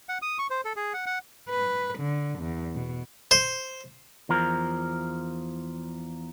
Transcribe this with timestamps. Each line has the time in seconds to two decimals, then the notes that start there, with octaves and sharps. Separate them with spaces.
0.09 F#5
0.22 D#6
0.39 C#6
0.50 C5
0.65 A4
0.76 G#4
0.94 F#5
1.06 F#5
1.50 B4
1.98 D3
2.39 E2
2.75 B2
3.31 C5
4.29 E2 F3 A#4